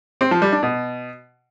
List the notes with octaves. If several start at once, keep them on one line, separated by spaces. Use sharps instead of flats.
C4
F3
G3
D4
B2